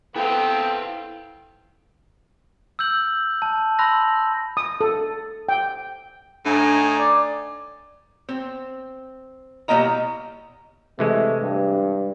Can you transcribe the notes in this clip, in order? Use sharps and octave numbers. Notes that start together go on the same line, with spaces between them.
B3 C4 E4 A4 F5 G5
E6 F6 G6 F#7
A5
A5 B5 C6 E6 F#6 A#6
D#6
A4
G5
A2 D4 D#4 G#5
D5
C4
B2 G3 A#3 E4 D#5 A#5
C3 E3 G#3 A3
G2